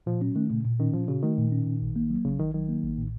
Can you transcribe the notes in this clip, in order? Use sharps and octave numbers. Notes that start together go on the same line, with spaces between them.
A#2 F3
F#3 C#4
D#3 A3
A#2 C#3
A#2
D#3 C#4
A#2 F3
C#3 F#4
D#3 A3
A#2
C#4
A#2
A1
A#3
F#3
A1 C#3
A1 D#3
D#3 F#3
A#3
A1
A2